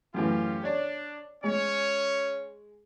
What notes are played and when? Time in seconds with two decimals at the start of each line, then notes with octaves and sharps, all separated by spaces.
0.14 F#2 A2 E3 C#4 F4 G4
0.63 D4 C#5 D5
1.44 G#3 C#4 C#5